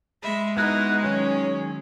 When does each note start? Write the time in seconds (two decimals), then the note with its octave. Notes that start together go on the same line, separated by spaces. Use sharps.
0.23 G#3 E5 B5
0.57 B3 D#4 E4 F#4 B4 F#6
1.03 D#3 F#3 C#4 G#4 C#5